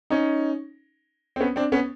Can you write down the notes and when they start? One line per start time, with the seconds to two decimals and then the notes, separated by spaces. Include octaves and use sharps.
0.10 C#4 D#4
1.36 C4
1.40 B3 C#4
1.56 C4 D4
1.72 B3 C#4